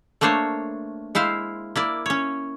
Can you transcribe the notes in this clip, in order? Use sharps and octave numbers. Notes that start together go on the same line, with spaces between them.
A3 A#3 D4 C5 C#5
G#3 E4 C5 F5
A#3 E4 D5
C#4 C#5